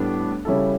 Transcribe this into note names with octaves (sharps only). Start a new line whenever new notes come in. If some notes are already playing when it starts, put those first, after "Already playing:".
Already playing: A2 G3 B3 D4
C#3 G3 C#4 E4 A4